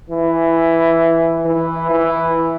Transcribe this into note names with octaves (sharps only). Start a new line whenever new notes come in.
E3
E3
E3